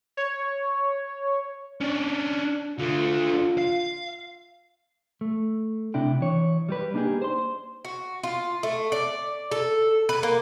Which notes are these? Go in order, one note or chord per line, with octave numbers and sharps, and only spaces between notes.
C#5
C#4 D4
D3 A3 F4
F5
A3
C3 C4 D4 E4 G5
E3 C#5
G3 G4 B4
A#3 D4 D#4 F4 G4 G#4
C5 C6
F#4
F4
A3
D5
A4
B4
A#3